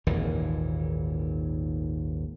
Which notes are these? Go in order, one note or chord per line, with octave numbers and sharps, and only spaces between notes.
G#1 D#2 A#2 E3